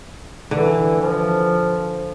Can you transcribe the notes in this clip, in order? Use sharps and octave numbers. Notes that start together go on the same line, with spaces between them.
D3 E3
F3